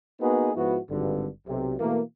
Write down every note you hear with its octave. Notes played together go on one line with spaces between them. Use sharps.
A#3 B3 D#4 F#4 G#4 B4
G#2 F3 B3 E4 F#4
G#1 G2 D3
B1 C3
B2 E3 A3 A#3